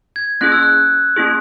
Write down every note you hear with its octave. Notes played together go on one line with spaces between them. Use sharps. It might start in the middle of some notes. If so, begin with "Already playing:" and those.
G#6
A#3 C#4 E4 G#4 F#6
E6
F#6
A#3 C#4 E4 G#4